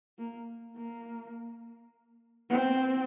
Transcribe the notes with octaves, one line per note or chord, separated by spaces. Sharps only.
A#3
A#3
C4